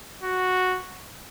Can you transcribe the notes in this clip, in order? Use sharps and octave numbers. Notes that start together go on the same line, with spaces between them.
F#4